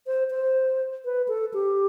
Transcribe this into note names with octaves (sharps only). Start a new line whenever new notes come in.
C5
C5
B4
A4
G4